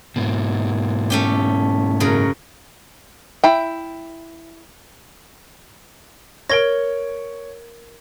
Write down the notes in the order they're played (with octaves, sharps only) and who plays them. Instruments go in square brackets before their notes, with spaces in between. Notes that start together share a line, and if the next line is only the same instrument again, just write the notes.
[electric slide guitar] G#2 B2
[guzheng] A3 C#4 G4
F#2 C#3 A#4
[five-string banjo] E4 G5
[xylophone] A#4 G#6 A#6 [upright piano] C#5 D7